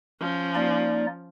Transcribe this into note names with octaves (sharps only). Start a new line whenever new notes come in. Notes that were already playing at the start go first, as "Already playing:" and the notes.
F3 C#4
A#3 D#4 D5